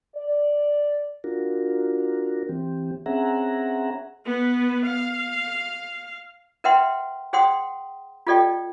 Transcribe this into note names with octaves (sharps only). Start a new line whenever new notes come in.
D5
D4 F4 F#4 A#4
E3 C4 G4
C4 C#4 G#4 E5 F#5 A#5
B3 B4
F5
A#4 B4 E5 F#5 G5 C6
G#4 C5 F#5 G5 C6 D#6
F4 G4 A4 D5 D#5 G5